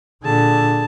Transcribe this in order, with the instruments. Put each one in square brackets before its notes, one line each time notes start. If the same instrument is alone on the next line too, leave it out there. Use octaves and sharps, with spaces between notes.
[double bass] A#2 D3 [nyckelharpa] G#4 A5